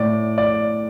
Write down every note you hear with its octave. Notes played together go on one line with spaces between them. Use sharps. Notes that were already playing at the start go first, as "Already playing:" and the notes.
Already playing: A2 D5
D5